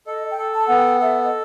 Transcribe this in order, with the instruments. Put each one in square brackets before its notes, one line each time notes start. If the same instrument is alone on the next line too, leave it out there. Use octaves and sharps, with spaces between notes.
[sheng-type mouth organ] A4 [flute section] D#5
[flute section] G5
[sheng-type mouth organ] A4
[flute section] A5
[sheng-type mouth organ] B3 [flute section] F#5
[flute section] G5
[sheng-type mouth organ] A4 [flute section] E5
[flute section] D#5